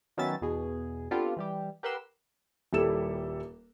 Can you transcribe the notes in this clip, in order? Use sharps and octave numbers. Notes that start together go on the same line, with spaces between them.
D#3 F#3 B3 C#4 E5 A6
E2 B2 G#4
B3 C4 D4 F4 G4 A4
E3 G3 G4
G4 A#4 B4 F#5 C6 E6
D#1 G3 E4 A4 E7